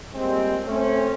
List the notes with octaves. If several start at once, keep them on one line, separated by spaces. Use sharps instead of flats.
A#2 G3 G#3 C4
A3 C4 C#4